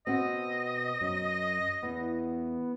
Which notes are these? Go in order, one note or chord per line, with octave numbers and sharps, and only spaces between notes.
B2 C4 D#5 F#5
F#2
E2 B3